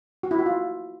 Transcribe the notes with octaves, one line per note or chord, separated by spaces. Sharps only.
F#4
E4
F#4
F4